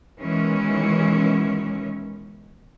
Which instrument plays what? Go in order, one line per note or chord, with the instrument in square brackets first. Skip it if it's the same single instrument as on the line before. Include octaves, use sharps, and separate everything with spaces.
[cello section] B2 D#3 E3 G#3 C#4